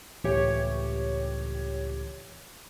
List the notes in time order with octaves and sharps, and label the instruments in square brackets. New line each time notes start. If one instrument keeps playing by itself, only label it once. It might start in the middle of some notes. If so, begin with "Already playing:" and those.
[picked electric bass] C#2 A2 E3 [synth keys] G4 C#5